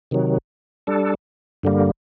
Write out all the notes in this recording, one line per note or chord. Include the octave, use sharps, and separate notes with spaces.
C3 D#3 F#3
G3 D4 A4
G2 D3 G3 A#3